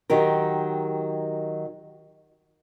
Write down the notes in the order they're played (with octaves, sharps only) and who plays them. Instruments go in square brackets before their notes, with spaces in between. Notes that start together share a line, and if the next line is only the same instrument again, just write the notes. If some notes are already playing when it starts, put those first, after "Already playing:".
[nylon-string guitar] D#3 F#3 G4 A#4